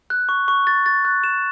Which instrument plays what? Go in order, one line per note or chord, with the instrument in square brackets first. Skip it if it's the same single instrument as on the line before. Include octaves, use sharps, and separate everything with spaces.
[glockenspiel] F#6
C#6
C#6
A6
A6
F#6
E7